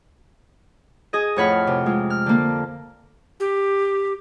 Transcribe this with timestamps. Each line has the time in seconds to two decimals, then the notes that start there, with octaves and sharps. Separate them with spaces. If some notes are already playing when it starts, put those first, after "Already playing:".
1.13 G#4 D#5
1.36 F2 A2 C#5 F#5 B5 F6
1.67 C3
1.86 G#3 F4
2.10 F6
2.26 D3 A#3
3.40 G4